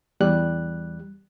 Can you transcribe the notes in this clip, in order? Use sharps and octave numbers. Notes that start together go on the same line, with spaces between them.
E2 G3 F#6